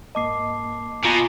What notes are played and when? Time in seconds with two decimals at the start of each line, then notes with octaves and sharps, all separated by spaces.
0.15 G#2 A#3 D#5 A5 D6 C7
1.05 B2 F4 G#5 A#5